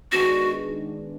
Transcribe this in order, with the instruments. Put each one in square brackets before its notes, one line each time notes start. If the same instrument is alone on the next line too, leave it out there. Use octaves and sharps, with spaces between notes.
[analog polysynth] D#3 G#3 B3 D4 [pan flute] F#4